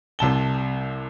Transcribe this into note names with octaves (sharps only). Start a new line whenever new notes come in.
C2 C3 A5 G7